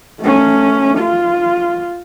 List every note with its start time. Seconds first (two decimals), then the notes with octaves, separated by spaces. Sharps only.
0.21 A3 C#4
0.98 F4